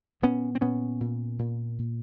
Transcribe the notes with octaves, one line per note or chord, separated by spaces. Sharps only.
A#2 B3 C#4
C4
A#2 B3 C#4
A#2
A#2
A#2